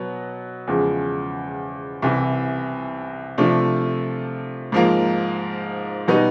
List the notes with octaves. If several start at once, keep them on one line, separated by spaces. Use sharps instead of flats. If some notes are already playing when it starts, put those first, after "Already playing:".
Already playing: B2 F#3 B3
E2 C#3 F3 G#3
C2 C3 E3
C3 F3 A3 D4
G#2 F3 A#3
B2 G3 B3 D#4